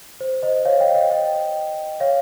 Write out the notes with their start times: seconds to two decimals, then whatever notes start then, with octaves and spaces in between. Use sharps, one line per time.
0.21 C5
0.43 C5 D#5
0.65 C#5 F5
0.80 D#5 G5
0.95 D#5 G5
1.10 D#5 G5
2.00 C#5 F5